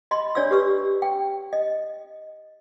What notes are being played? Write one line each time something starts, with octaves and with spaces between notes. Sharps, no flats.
D#5 B5 C6
D4 C#5 D5 B5 E6
G4 B4 C#6 E6
G5
D#5